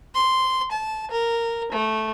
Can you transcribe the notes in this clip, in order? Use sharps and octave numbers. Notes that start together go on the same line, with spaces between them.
C6
A5
A#4
A3